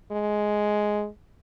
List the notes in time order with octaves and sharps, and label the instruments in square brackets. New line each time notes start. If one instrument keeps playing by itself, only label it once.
[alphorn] G#3